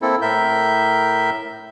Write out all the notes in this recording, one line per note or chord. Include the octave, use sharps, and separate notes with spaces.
A#3 C4 E4 A4
A2 A#4 E5 G6